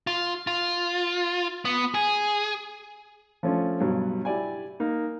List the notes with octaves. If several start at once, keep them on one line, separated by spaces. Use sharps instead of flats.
F4
F4
B3
G#4
F3 A3 C#4 D4 F4
G2 B2 F#3
E4 G4 D5 G#5
A#3 D#4